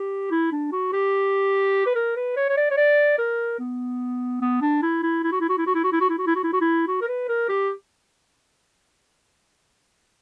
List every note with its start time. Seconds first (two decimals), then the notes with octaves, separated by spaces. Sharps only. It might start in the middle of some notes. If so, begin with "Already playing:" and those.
Already playing: G4
0.31 E4
0.52 D4
0.72 F#4
0.93 G4
1.86 B4
1.95 A#4
2.16 B4
2.36 C#5
2.49 C#5
2.57 D5
2.71 C#5
2.77 D5
3.18 A#4
3.59 B3
4.41 B3
4.62 D4
4.82 E4
5.03 E4
5.23 E4
5.32 F#4
5.40 E4
5.49 F#4
5.58 E4
5.66 F#4
5.75 E4
5.84 F#4
5.92 E4
6.01 F#4
6.09 E4
6.18 F#4
6.27 E4
6.35 F#4
6.44 E4
6.53 F#4
6.61 E4
6.87 F#4
7.01 A#4
7.08 B4
7.28 A#4
7.49 G4